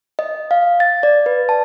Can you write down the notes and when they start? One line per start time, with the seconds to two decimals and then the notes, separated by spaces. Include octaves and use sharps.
0.19 D#5
0.51 F5
0.80 A6
1.03 D5
1.26 B4
1.49 A5